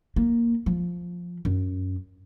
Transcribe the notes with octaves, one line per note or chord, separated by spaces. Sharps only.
A#3
F3
F#2